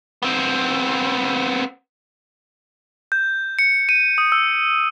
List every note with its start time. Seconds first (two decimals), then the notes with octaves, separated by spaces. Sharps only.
0.22 B3 C4
3.12 G6
3.59 C#7
3.89 D#7
4.18 D#6
4.32 E6